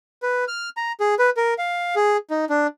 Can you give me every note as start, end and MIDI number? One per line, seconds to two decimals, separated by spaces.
0.22 0.45 71
0.48 0.69 89
0.77 0.92 82
1.00 1.15 68
1.19 1.30 71
1.37 1.54 70
1.58 1.95 77
1.96 2.17 68
2.30 2.45 63
2.50 2.67 62